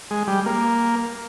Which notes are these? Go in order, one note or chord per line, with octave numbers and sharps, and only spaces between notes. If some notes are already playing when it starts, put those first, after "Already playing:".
G#3
G3
A#3